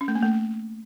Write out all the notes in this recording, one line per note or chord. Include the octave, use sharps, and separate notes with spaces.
C#4
A3
A#3
A3